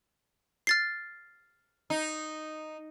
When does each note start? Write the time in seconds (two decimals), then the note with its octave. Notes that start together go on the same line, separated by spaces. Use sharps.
0.67 F6 A6 C7
1.90 D#4